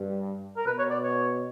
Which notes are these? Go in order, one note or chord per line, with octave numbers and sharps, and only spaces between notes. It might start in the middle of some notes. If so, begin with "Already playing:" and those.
Already playing: G2
A#4
B2 B4
C#5
D5
C#5